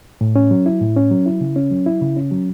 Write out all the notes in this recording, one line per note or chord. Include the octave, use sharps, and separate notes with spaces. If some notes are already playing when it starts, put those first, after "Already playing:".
A2
C#4
F#3
E4
A2
C#4
F#3
E4
C#3
C#4
F#3
E4
C#3
C#4
F#3